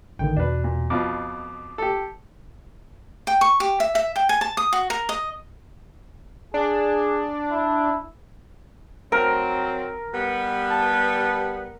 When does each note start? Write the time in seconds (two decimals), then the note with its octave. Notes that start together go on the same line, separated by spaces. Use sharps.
0.19 A1 D3 D#3 G5
0.36 E2 B2 D4 B4
0.64 A#2
0.90 F2 B2 F4 D6
1.78 G4 A4
3.27 G5
3.41 C#6
3.60 G4
3.80 E5
3.95 E5
4.16 G5
4.29 G#5
4.41 A5
4.57 D#6
4.73 F#4
4.90 A#4
5.09 D#5
6.54 D4 G#4
7.51 E4
9.12 F#3 C4 A#4
10.13 G3 B3
10.70 A5